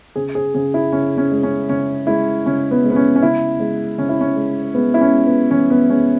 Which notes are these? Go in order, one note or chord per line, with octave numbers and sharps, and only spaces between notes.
C#3 G#4
G#4
C#3 G#4
E4
C#3 C#4
C#4
G#3
C#4
C#3 C#4
G#3 E4
C#3 C#4
B3
G#3
B3
C#4
C#4
C#3 E4
G#3
C#3 C#4
E4
C#4
G#3
G#3 B3
E4
C#4
G#3
B3
E3 C#4
B3
G#3 C#4